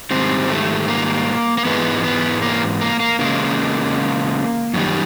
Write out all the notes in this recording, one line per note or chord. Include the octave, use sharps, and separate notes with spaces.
G#2 D#3 G3 C4
A3
A#3
A#3
G#2 E3 G#3 B3
B3
A#3
A#3
A#3
E2 C#3 G#3 A#3
F#2 D#3 G3